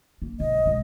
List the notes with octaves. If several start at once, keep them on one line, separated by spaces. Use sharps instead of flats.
A#3
B1 D#5
B2 G#3